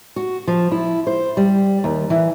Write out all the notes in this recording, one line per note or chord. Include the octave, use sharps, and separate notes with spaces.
F#4
F3
E4
C5
G3
D#2
E3